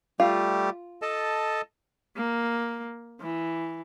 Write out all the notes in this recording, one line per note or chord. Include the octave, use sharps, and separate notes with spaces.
G3 A3 F4 G4
A4 D#5 A5
A#3
E3